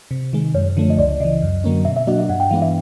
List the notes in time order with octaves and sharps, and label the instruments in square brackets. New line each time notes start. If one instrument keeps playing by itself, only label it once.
[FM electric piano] C3
D#3 G#3
[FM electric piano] F#2 [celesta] C#5
[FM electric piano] D3 F3 A3
[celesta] D#5
[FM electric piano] C#2 [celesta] D5
[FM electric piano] C#3 E3 [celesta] D#5
[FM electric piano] F#2
D3 F#3 A#3 C#4
[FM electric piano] B2 [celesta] E5
[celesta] E5
[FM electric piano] F#3 A#3 D4 F#4 [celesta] D#5
[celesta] E5
[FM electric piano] G2 [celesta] F#5
[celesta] G5
[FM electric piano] E3 G#3 B3 D4 [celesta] F5
[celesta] E5